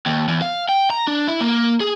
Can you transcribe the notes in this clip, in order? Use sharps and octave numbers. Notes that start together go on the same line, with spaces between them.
D#2
E2
F5
G5
A#5
D4
E4
A#3
G#4